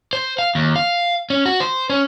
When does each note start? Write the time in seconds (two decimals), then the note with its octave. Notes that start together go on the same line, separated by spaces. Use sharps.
0.13 C5
0.39 F5
0.55 D#2
0.76 F5
1.30 C#4
1.46 F#4
1.60 C5
1.90 C#4